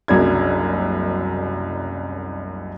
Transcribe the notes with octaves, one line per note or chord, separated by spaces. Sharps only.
F#1 C2 F#2 D4 G#6